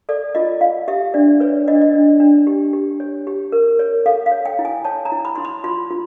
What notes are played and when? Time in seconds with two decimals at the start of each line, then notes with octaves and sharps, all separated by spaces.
0.09 A4 D5
0.35 F4 D#5
0.61 F4 F5
0.88 G4 E5
1.14 D4 D5
1.40 B4 C#5
1.68 D4 D#5
1.75 D5
1.81 D#5
1.94 D4
2.20 D4
2.47 G4
2.73 G4
3.00 C#5
3.27 G4
3.52 A#4
3.79 C#5
4.06 A4 F5
4.26 F5
4.32 C#5
4.46 G5
4.59 E4
4.65 G#5
4.84 C#5 A5
5.05 A#5
5.12 E4
5.25 B5
5.35 E4 C6
5.45 B5
5.64 F4 C6
5.90 F4